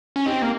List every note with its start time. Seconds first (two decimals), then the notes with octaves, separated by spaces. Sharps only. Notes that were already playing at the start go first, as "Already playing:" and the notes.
0.16 C#4
0.26 C4 D#4 G4
0.42 A#3